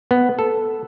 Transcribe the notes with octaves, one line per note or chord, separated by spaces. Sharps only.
B3
A4